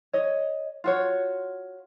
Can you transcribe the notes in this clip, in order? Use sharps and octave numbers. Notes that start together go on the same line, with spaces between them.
C#5 D#5
F4 F#4 C#5